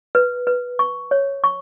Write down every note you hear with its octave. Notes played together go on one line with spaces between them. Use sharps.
B4
B4
C#6
C#5
C#6